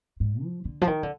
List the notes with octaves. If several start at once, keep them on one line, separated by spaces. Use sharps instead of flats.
G#2
F3
D3
F3
D#3
D3